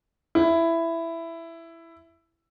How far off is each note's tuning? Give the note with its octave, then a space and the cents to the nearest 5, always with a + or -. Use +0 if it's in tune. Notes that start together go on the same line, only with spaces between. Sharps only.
E4 +10